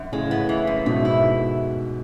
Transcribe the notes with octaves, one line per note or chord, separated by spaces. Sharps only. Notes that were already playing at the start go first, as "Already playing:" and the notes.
Already playing: F#2
A2 C#3 G#3
B3
E3
F#2
G#2 B2 A3
E4